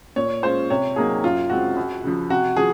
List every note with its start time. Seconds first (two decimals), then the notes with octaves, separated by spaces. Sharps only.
0.16 A#2 C#5
0.43 G#3 C#4 F4 C5
0.70 C3 C#5
0.96 F#3 A#3 D#4 G#4
1.24 F#2 F4
1.49 C#3 G#3 C4 F#4
1.76 C#2
2.04 C#3 F3
2.30 C3 F#4
2.56 F3 G#4